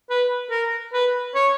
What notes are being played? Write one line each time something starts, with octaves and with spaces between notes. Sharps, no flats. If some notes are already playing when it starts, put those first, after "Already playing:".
B4
A#4
B4
C#5